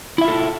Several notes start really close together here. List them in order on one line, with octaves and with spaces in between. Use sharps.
E4 E5 F4 A4